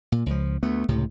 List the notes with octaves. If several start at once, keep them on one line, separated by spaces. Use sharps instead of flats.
A#2
C#2 F3
D2 A3 B3
C#2 A2 C3